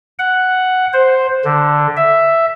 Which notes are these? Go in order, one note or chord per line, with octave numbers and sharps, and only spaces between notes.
F#5
C5
D3
E5